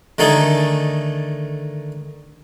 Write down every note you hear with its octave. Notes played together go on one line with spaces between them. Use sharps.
D3 D#3 A3 D#4 G#4 A4